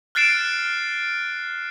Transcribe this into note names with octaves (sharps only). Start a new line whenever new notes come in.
F6 F#6 A6 C7 D7 E7